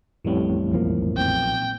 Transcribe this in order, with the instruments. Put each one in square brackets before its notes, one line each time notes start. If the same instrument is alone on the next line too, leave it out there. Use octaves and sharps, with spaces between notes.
[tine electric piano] A1 F2 A2 [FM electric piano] E3 G3
[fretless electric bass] B1 F3 A#3
[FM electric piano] A#2 C4 [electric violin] G5